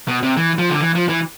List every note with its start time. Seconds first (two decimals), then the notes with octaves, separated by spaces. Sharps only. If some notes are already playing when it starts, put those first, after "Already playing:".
0.08 B2
0.23 C3
0.37 E3
0.58 F3
0.70 D3
0.81 E3
0.95 F3
1.09 E3